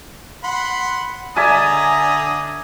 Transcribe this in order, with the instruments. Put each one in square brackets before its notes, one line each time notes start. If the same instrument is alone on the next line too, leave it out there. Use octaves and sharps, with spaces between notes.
[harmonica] F#5 B5 C6
[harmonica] D3 A#5 D#6 [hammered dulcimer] D5 E5 G#5